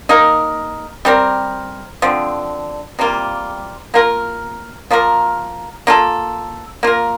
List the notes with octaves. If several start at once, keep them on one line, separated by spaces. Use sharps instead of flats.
A#3 D#4 A#4
G3 C4 G4 A#4
D3 F3 C4
C3 G3 A#3 F4
A#3 F4 A#4
F3 A#3 F4 A#4
A#3 F4 A4
A#3 F4 A#4